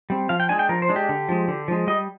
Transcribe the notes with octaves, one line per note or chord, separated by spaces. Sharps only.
G3 C4
F3 F5
G5
G#3 D4 G#5
G5
F3 A#4
C5
G#3 D4
G4
D3
F3 G#3
D3
F3 G#3
G3 D#5